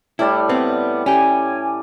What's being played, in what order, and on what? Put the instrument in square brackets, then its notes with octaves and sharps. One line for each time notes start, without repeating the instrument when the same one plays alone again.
[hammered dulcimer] A2 G3 D5 [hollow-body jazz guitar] E4
[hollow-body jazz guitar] B3 C4
[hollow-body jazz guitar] C#4 G4 [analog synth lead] G#5